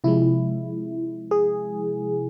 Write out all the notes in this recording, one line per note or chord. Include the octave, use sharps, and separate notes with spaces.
C3 F3 G#3 E4
G#4